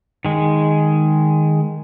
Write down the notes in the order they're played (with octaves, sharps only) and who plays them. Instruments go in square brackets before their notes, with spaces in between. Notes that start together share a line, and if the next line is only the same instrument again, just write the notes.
[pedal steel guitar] D#3 G#3